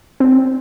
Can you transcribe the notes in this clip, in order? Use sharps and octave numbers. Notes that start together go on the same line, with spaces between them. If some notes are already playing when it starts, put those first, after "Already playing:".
C4